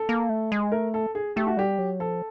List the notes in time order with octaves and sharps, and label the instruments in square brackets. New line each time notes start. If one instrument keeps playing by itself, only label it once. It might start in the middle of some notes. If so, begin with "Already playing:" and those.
Already playing: [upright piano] A4
[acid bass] A#3
A3
G#3
[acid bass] A3 [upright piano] A#4
[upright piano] A4
G#4
[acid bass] A3 [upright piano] G4
[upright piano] F#4
[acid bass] G3 [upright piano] G4
[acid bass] F#3
[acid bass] F3 [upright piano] A4